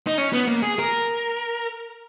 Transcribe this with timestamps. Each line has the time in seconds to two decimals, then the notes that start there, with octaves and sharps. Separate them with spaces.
0.07 D#4
0.18 C#4
0.33 B3
0.48 A#3
0.63 G#4
0.79 A#4